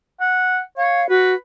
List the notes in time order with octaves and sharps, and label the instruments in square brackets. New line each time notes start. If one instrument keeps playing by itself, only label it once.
[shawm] F#5
[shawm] C#5 [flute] F5
[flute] F#4 [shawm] B4